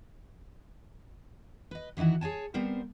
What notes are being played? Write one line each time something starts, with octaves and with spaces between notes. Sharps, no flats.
B4 D#5
D#3 E3 D#4 E4 F#4
G#4 C#5 G#5 A5
G3 B3 C4 A#4 C5